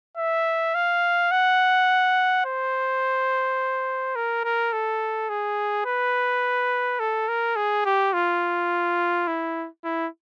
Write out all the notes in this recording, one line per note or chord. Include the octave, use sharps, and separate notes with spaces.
E5
F5
F#5
C5
A#4
A#4
A4
G#4
B4
A4
A#4
G#4
G4
F4
E4
E4